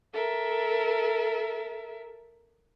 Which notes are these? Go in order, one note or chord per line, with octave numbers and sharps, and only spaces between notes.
A4 A#4 E5